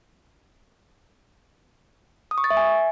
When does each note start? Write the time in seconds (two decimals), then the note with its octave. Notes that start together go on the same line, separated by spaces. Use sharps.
2.31 D#6
2.38 C#6
2.44 A6
2.50 E5
2.57 G#5